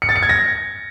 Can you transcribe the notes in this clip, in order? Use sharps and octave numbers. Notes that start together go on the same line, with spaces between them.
C#7
A6
C#7
G#6
A#6